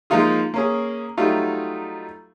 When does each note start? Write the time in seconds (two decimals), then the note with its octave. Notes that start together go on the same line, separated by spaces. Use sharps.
0.10 F3 G#3 A#3 D#4 F4 G#4
0.54 A#3 C#4 G#4
1.17 F#3 G3 A3 D#4 F4